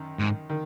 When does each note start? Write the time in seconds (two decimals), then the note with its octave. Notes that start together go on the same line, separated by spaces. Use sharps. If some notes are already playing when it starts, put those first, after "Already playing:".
Already playing: F#2 D#3
0.19 G#2
0.49 D#3